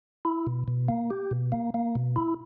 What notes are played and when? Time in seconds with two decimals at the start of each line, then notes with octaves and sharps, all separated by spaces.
0.25 E4
0.47 B2
0.68 B2
0.89 A#3
1.10 G4
1.31 B2
1.52 A#3
1.74 A#3
1.95 B2
2.16 E4